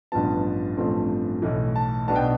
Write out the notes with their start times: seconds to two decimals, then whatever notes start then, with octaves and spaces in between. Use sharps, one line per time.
0.12 A1 G2 F3 B3 A5
0.77 A1 G2 F3 A3 C4
1.42 B1 A2 E3
1.76 A5
2.08 B1 B2 B3 D4 A5
2.16 G5